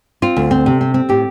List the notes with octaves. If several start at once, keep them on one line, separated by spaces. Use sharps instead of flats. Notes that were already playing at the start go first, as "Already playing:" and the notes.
C4 F4
D2
C4
C3
C4
C4
A2 G4